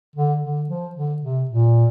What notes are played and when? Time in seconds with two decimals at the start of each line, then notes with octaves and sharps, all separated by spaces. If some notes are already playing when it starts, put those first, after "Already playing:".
0.16 D3
0.43 D3
0.69 F3
0.95 D3
1.22 C3
1.49 A#2